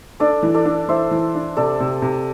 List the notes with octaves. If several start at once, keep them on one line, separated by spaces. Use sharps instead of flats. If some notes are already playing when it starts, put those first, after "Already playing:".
D4 A4 D5
E3
A4 D5
D4
E3 C5 E5
E3
D4
C3 A4 D5
C3
C3